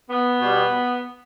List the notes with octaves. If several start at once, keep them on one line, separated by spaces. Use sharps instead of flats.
B3
B2 G3